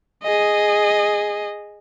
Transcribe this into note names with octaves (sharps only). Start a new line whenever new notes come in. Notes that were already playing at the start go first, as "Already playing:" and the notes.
G#4 D#5